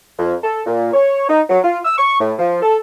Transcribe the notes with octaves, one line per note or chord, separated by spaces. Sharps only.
F2
A4
A#2
C#5
D#4
F#3
F4
E6
C#6
A2
F3
A4